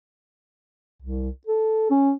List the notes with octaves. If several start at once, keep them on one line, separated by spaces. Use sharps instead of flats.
C2
A4
C#4